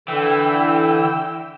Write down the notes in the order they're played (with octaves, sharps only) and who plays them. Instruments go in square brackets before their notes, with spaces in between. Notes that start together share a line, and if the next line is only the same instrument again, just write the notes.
[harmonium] D3 [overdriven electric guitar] E3 [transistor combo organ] G5 E6